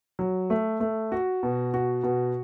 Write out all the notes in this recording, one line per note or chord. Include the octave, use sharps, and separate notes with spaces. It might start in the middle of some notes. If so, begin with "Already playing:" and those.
F#3
A3
A3
F#4
B2
F#4
B2